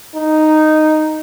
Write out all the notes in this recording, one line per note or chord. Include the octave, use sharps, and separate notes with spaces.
D#4